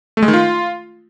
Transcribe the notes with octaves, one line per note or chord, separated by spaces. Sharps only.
A3
G#3
D#3
F4